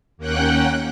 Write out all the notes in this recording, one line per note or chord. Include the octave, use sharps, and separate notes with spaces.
D#2 A#3 C#4 F#5 G5 F#6